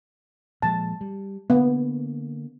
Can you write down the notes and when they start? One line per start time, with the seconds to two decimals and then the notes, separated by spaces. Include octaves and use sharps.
0.62 A#2 F3 G#3 A5
1.01 G3
1.50 D3 A#3 B3